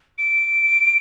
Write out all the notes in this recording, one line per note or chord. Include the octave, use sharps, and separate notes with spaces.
D7